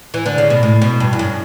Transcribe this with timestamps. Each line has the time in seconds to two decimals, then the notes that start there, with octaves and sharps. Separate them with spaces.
0.14 E3
0.26 D3
0.38 C#3
0.50 B2
0.63 A2
0.82 B2
1.00 G2
1.13 E2
1.19 F#2